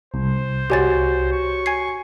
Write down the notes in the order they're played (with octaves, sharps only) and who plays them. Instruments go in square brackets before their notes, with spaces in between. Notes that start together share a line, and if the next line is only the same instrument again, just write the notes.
[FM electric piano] C2 [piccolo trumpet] C5
[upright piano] F#4 C#5 [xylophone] G4 G#5 A6
[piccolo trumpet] C#6
[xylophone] G#5 G#6 C7